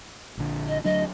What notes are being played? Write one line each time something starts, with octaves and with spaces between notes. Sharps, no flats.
A#1 D3
D#5
D2 F#3 D4 D#5